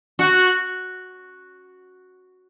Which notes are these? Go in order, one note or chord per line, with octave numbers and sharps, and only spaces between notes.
F#4